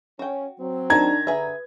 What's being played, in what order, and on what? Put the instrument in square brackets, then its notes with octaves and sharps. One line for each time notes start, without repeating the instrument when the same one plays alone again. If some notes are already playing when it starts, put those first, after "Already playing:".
[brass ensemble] C#4 [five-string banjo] F#4 G5
[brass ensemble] F#3 C4
[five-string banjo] D#3 A5 [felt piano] D4 D#4 [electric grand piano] A#5 G#6
[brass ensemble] D3 [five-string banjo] G#4 E5 [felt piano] B4